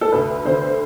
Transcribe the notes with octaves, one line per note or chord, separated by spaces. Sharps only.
A4
D2 B4
D3 C5